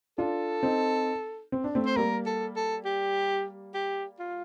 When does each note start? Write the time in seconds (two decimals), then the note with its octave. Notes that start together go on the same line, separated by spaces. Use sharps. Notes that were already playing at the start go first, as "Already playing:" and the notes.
0.18 D4 F4 A4
0.63 C4 D#4
1.52 C4
1.64 D4
1.75 A3 C4
1.86 C5
1.96 G3 A#3 A#4
2.26 A4
2.56 A4
2.85 G4
3.74 G4
4.19 F4